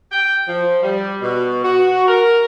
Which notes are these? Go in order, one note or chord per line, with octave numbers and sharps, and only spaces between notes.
G5
F3
G3
B2
F#4
A#4